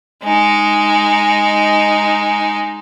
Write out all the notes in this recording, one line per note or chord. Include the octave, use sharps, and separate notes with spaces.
G#3 D#4